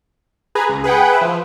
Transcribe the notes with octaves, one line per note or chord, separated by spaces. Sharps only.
G#4 B4 G#5 A#5
C#2
G#4 B4 F#5 G5
B4 E5
F3